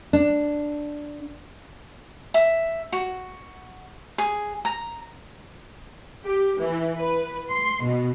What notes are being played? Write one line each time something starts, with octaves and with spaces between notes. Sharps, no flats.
D4
E5
F#4
G#4
A#5
G4
E3
B4
C6
B2